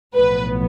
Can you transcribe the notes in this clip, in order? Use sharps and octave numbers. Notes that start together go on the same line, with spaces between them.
B1 A2 F3 B3 B4